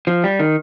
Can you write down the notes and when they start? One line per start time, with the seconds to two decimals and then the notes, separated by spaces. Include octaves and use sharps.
0.07 F3
0.24 G3
0.40 D#3